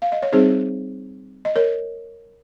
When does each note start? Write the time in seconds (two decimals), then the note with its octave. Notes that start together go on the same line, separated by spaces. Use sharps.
0.02 F5
0.12 D#5
0.22 C#5
0.32 G3 C4 D#4 G#4 C5
1.45 D#5
1.56 A#4 C#5